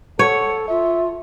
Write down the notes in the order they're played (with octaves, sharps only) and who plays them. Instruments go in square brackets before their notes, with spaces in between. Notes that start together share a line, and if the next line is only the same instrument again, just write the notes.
[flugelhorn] A4 [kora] C#5 [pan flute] F#5
[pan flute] F4 [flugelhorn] E5